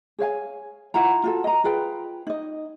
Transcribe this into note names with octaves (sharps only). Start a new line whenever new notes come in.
G#4 C#5 F5 G#5
E4 F4 F#5 A#5
F4 F#4 A4
D#5 A#5
F4 G#4 B4 G5
D#4 D#5